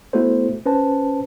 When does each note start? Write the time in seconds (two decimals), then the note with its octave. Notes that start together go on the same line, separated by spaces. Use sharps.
0.13 A3 B3 E4 F#4 A4 C5
0.66 C#4 B4 C5 A5